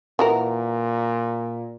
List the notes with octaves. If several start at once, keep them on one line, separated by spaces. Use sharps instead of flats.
A#2 E3 F#4 A#4